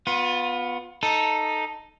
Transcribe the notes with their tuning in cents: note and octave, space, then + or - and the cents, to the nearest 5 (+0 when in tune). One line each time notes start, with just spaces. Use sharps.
B3 +0 F4 +30
D#4 +0 A4 +5